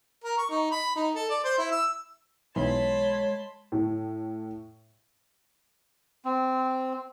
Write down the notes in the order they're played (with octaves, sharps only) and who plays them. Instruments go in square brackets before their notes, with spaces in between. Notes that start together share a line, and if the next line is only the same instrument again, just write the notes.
[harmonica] A#4
C#6
D#4
B5
D#4
A4
D5
C5
E4
E6
[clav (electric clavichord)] B1 E3 [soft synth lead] G#3 [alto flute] C#5 [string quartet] A5 B5 C6
[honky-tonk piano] A2
[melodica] C4